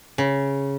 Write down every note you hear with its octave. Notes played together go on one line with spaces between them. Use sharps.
C#3